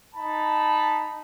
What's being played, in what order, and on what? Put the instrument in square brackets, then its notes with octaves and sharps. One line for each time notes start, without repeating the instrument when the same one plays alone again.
[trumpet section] D#4 A5 B5